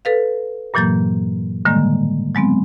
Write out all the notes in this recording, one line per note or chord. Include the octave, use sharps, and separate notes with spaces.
A4 B4 F5
G2 A#2 E3 F#3 A#3 G6
A2 D3 D#3 G3 G#3 A#3
F#3 G#3 B3 C4